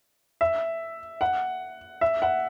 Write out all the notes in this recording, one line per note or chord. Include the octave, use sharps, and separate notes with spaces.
E5
F#5
E5
F#5